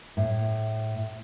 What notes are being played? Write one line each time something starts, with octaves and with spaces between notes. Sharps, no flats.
A2